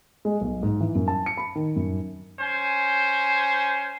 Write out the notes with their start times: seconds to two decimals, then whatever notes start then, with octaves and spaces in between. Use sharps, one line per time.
0.25 G#3
0.41 B1
0.63 G#2
0.80 E3
0.95 F#2
1.08 A5
1.26 C#7
1.37 B5
1.56 D#3
1.76 F#2
2.40 C#4 C5 G#5